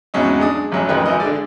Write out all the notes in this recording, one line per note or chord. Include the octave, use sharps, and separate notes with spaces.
E2 G#2 C3 F#3 C#4 D#4
G#3 D4 D#6
A1 F#2 F#3 G#3
A1 F2 D#3 B4
G#1 E3 D#5
D3 G#3 D5